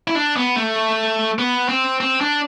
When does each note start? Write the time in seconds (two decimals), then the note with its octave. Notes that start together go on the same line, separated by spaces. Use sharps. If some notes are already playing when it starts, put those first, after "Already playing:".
0.08 E4
0.15 D4
0.36 B3
0.56 A3
1.39 B3
1.69 C4
2.00 C4
2.21 D4